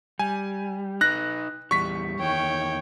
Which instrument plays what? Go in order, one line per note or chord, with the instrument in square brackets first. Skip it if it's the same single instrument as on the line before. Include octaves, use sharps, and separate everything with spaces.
[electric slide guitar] G3 [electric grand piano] G#5
[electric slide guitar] D#4 B4 [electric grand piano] F#6 A#6
[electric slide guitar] E2 G3 [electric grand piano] C#6 B6
[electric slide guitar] E2 D#3 [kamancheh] C#5 G5